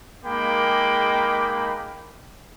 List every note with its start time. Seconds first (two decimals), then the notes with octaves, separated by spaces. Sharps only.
0.25 G#3 A#3 D#4 G5 B5 D6